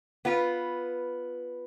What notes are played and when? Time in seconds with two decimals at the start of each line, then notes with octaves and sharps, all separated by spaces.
0.25 B3 F4 B4